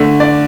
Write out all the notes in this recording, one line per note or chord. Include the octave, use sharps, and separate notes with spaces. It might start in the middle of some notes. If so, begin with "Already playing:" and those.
Already playing: D3 A3
D5